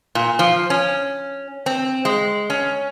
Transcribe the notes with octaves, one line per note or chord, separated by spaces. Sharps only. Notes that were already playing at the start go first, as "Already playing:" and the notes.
A#2
F3
C#4
C4
G#3
C#4